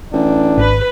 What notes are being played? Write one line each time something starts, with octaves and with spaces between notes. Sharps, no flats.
A1 D4
G#1 B4